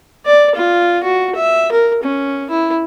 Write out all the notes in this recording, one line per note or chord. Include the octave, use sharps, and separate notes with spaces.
D5
F4
F#4
E5
A#4
C#4
E4